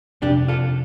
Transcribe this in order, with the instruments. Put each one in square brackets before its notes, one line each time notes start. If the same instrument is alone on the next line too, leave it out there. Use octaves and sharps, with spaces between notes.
[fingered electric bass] F2 C3 F3 C4 [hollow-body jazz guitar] D4 G4
[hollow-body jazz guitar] F4 A4